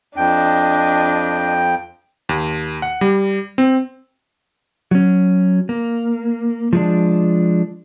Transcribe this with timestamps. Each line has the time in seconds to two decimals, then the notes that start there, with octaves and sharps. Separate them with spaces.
0.17 F2 D4 D#5 G5
2.29 D#2
2.82 F#5
3.01 G3
3.58 C4
4.91 F#3 C#4
5.69 A#3
6.73 F3 G#3 D4